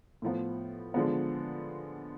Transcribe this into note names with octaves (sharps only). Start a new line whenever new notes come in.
A2 F3 B3
D3 F3 G#3 B3